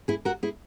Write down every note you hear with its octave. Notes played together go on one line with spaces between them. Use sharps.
E4 G#4
F#4 A#4
E4 G#4